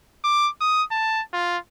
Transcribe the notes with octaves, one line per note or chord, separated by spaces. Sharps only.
D6
D#6
A5
F4